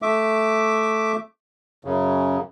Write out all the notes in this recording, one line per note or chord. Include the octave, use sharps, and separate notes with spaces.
A3 E5 D6
F#2 C#3